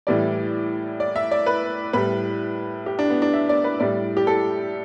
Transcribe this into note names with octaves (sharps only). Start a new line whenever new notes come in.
A2 E3 G3 D5
D5
E5
D5
B4
A2 G3 B4
G4
D4
B3
D4
E5
D5
B4
A2 G3 D5
G4
A4